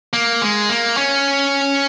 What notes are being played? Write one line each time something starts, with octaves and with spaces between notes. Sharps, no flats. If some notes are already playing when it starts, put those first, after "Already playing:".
A#3
G#3
A#3
C#4